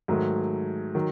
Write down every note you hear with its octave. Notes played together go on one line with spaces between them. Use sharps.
G#2 D#3 F#3 A3
D#3 F#3